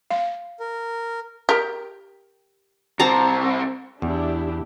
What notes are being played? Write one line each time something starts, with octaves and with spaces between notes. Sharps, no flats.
F5
A#4
G4 A#4
C2 C4 C5 A5 A#5
E2 D4 E4 G4